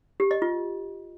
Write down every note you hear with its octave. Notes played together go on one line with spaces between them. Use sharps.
G4
D#5
F4